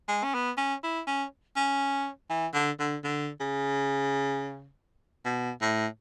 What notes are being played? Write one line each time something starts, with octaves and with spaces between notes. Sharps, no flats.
G#3
C#4
B3
C#4
E4
C#4
C#4
E3
D3
D3
D3
C#3
B2
A2